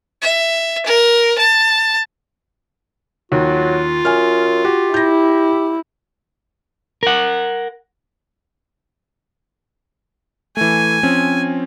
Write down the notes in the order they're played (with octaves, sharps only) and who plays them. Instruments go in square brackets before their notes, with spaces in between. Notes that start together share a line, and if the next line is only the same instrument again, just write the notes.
[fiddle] E5
A#4
A5
[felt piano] D#2 [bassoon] F#3 [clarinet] F4
[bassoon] F#2 [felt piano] G#5 F6
[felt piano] F#4 [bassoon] G4
[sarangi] E4 [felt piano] G6 A#6
[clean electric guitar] A#4 F#5
[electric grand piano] E3 A3 [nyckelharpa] G#5
[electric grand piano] F3 C4 C#4